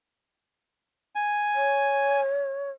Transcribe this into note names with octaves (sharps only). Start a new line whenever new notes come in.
G#5
C#5